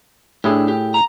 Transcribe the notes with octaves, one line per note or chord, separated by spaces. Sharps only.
A2 D4 E4 G4 G#4
G4
A#5